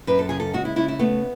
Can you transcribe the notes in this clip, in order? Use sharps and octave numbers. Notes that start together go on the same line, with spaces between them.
F#2 B4
A4
C#3 G#4
A4
G#3 F#4
E4
C#3 E4
E4
A3 B3